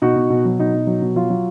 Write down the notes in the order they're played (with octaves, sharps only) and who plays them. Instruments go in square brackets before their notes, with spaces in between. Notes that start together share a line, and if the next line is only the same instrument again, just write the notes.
[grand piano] B2 D#4 F#4
B2
B2
F#3
B2 D#4
B2
F#3
B2
F#3 F4
F#3